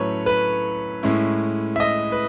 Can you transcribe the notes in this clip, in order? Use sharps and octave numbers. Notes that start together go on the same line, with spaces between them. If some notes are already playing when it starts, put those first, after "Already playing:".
Already playing: A2 F#3 A3 C#4 B4 C#5
B4
A2 G#3 C#4 E4
E5
D#5
B4